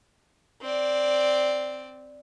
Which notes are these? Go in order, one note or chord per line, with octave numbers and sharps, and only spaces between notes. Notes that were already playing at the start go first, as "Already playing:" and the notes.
C4 D5